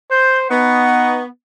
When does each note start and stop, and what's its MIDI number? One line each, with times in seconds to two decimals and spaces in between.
0.11 0.49 72
0.11 0.38 91
0.50 1.24 59
0.50 1.21 63
0.50 1.19 78
0.50 1.23 85